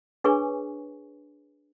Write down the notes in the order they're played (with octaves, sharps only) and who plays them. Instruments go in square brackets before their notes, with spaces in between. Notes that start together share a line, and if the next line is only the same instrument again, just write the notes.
[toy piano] D4 G#4 B4 C#5 G#5 C#6